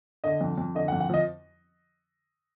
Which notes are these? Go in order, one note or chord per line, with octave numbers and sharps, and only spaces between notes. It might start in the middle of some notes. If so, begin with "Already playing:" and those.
D3 D#5
F2
F2
D3 D#5
F#5
F2
F#5
F3 D#5